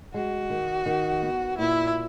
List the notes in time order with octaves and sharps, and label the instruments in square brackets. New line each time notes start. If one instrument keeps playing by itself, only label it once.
[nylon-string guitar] G#3 [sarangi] F#4
[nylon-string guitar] D#3
D#3
B3
[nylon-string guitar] A#2 [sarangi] E4